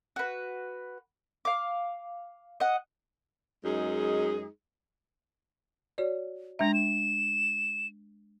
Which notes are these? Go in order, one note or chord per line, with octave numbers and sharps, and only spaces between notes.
F#4 B4
F5 D6
D#5 F#5
F#2 G#3 D#4 G#4
F#4 C#5 D5
G#3 D4 E5 A#5
E7